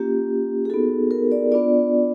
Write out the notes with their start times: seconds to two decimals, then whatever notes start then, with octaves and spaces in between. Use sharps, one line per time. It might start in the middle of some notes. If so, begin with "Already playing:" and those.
Already playing: A#3 C#4 F4 G4
0.65 G#4
0.70 B3 D#4 F#4 A4
1.11 A#4
1.32 D5
1.52 B3 D4 F4 D5